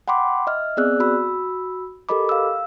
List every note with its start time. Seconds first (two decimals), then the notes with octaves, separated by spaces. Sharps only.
0.08 F#5 G5 B5 C6 D6
0.47 D#5 E5 F6
0.77 B3 C4 G#4 D5 E6 F#6
1.00 F#4 B5 E6
2.09 G4 A4 A#4 D#5 B5 D6
2.29 F5 E6